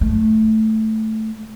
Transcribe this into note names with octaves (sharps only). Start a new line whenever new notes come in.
A3